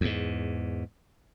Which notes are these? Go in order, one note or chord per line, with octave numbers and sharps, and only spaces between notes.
E2 G#2